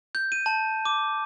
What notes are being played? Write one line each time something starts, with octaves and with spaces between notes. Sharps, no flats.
G6
D#7
A5
D6